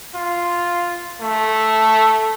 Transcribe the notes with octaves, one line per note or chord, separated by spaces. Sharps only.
F4
A3